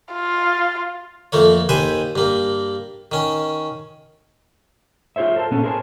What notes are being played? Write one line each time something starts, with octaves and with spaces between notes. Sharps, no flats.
F4
F2 A3 A#3 C#5
D#2 B4 C5 G#5 C6
G2 A#3
D#3 C#4
F4 G#4 C5 C#5 E5
A4 A#4 C5 A5
A#2 B3 C#4 A4
G#4 A#4 C5 C#5 G#5 A5